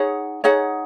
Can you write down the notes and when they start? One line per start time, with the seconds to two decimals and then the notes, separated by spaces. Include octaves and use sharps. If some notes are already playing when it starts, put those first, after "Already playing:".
Already playing: D#4 G#4 C#5 F#5
0.44 D#4 G#4 C#5 F#5